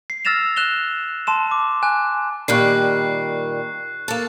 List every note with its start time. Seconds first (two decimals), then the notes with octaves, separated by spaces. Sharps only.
0.10 C7
0.25 E6 F6 A6 A#6 E7 F7
0.57 F#6 E7 F7 G7
1.27 A5 C6 E7
1.51 D6
1.83 G#5 F#6
2.48 A#2 D#3 G3 C#6 F#6 C7
4.08 A#3 A4